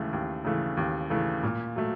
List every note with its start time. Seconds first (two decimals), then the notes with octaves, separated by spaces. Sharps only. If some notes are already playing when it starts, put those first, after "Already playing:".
Already playing: D#2 C#3 E3 A3
0.13 D#2
0.45 C#3 E3 A3
0.77 D#2
1.10 C#3 E3 A3
1.43 A#2
1.76 F#3 A3